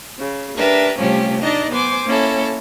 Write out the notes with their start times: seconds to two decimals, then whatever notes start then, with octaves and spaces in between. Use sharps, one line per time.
0.19 C#3
0.58 D4 G4 A#4 B4 E5
0.97 C3 F3 G3 A3 C#4 G4
1.41 D4 D#4 D5 D#5
1.70 B3 C5 G#5 D6
2.05 A#3 C#4 E4 A4